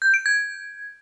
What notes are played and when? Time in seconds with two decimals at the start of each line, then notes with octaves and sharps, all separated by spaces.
0.02 G6
0.14 D7
0.26 G#6